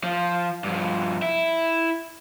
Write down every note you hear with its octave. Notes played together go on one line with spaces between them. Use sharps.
F3
G2 F3
E4